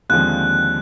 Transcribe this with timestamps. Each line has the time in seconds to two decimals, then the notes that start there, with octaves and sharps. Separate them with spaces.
0.09 D#2 D3 F3 G#3 C4 F#6